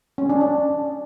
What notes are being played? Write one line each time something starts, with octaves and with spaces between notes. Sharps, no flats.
C#4
D4
D4